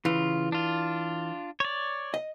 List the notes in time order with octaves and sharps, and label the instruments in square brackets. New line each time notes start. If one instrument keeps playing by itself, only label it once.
[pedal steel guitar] C#3 F4 [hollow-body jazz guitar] E3
[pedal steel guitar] D4 F4
C#5 D5
[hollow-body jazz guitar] D#5